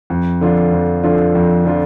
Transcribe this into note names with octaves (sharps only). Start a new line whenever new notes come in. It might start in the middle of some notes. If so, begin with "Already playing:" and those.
F2
D3 F3 D4 F4
F2
D3 F3 D4 F4
F2
D3 F3 D4 F4